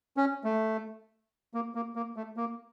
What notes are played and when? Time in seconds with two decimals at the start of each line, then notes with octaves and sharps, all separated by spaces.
0.17 C#4
0.44 A3
1.54 A#3
1.75 A#3
1.96 A#3
2.16 A3
2.37 A#3